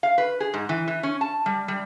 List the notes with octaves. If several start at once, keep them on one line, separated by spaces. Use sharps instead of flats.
F5
B4
G#4
G#2
E3
E3
C#4
A5
G3
G3